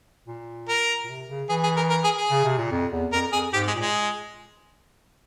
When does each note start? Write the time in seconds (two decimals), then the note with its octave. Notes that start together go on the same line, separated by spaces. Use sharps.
0.28 A#2
0.69 A#4
1.04 A#2
1.09 C3
1.29 C#3
1.49 E3 G#4
1.63 G#4
1.77 A#4
1.90 A#4
2.04 G#4
2.18 G#4
2.30 C#3
2.45 C3
2.58 A#2
2.71 F2
2.92 E2
3.12 F2 A#4
3.32 F2 G#4
3.53 G#2 G4
3.67 G#3
3.74 A#2
3.80 G#3